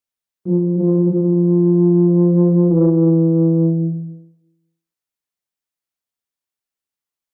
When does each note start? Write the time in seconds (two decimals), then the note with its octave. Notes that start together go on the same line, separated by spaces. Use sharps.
0.46 F3
0.78 F3
1.10 F3
2.70 E3